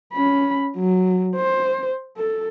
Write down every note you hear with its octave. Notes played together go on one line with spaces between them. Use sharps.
C#4 B5
F#3
C5
A4